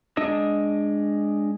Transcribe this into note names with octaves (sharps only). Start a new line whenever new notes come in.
G#3 D4 D#5 E6